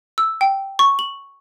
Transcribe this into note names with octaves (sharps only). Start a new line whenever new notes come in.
E6
G5
C#6
F#7